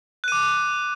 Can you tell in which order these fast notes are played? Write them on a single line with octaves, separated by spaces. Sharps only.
F#6 D#7 D6